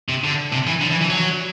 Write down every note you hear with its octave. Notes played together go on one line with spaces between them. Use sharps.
C3
D3
C3
E3
D3
E3
E3
F#3